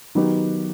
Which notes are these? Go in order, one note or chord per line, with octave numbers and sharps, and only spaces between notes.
D#3 F#3 B3 D#4 G4